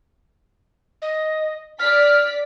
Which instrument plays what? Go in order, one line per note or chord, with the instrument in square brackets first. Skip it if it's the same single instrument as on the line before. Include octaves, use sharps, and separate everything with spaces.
[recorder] D#5
[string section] D5 B6 [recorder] F6